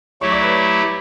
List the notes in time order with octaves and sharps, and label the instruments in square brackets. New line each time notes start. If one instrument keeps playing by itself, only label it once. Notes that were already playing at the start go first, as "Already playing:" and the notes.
[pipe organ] F#3 A3 E4 G4 [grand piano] C#5 C#6
[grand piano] D5 D6
B4 B5